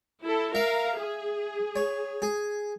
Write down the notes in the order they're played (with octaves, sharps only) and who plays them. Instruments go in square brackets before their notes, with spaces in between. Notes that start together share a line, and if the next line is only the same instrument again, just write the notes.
[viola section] E4 A4
[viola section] A#4 F5 [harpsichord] E5
[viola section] G#4
[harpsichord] C#5
G#4